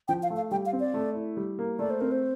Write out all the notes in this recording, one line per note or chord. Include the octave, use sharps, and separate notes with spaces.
F3 G5
F5
A3
F5
G3 G5
F5
C4
D5
A3
E4
G3
A#3
A3 D5
C5
C4 A#4
C5